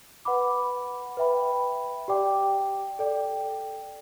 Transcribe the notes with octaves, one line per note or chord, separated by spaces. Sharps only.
B4 F#5 B5 D6
B4 E5 G5 B5
G4 D5 G5 D6
A4 D5 G5